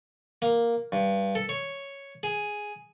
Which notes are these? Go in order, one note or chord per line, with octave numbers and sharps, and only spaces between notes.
A#3
G2
A4
C#5
G#4